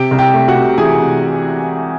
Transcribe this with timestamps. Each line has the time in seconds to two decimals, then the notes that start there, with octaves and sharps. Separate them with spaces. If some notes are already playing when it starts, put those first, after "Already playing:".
Already playing: C3 G4 G5
0.11 C2
0.19 G4 G5
0.34 A3
0.48 F#4 F#5
0.55 C3
0.78 E3 G#4 G#5
1.00 C3